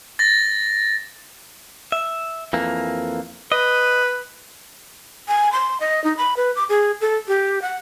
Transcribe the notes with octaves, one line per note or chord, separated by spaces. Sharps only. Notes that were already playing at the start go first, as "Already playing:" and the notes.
A6 A#6
E5
F2 E3 A#3
B4 D#5
G#5
C6
D#5
D#4
B5
B4
D6
G#4
A4
G4
F#5